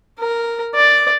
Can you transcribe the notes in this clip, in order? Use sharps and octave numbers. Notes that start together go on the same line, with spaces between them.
A#4
D5